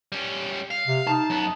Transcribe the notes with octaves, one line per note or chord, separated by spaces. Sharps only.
G3 C#4
F5
C3
D#4 A5
F#2 B3